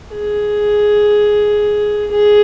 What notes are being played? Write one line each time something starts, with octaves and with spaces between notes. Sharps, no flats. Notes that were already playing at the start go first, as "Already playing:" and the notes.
G#4
G#4